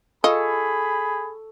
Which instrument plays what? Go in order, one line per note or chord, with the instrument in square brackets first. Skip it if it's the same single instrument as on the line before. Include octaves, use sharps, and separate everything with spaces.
[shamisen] F4 D#5 [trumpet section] G#4 B5 [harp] A4 C#6